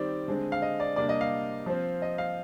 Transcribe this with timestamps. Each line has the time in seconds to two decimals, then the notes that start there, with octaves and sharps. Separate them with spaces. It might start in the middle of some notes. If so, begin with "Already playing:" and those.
Already playing: D#3 G3 C4 D5
0.28 D3 G#3 C4
0.52 F5
0.62 D#5
0.80 D5
0.96 C3 G3 A#3 D4 D5
1.09 D#5
1.21 F5
1.66 F3 C4
2.02 D#5
2.18 F5